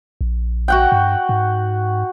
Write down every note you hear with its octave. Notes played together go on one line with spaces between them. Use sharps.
A#1
F#4 F#5 G5
G2
G#2